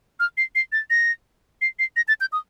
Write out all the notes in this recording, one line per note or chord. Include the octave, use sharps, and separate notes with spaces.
F6
C7
C7
A6
A#6
C7
C7
A#6
A6
G6
D#6